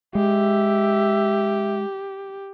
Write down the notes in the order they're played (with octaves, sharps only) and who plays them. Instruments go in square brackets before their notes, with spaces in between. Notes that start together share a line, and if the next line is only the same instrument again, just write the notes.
[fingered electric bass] G#3 [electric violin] G4 [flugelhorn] E5